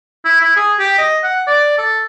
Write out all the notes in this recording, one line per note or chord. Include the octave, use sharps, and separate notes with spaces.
E4
E4
G#4
G4
D#5
F#5
D5
A4